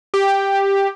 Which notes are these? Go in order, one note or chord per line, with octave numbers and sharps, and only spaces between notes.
G4